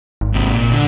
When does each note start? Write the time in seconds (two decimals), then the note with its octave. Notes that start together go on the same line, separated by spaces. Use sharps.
0.21 G#1
0.34 G#2 C3
0.51 A#2
0.73 D3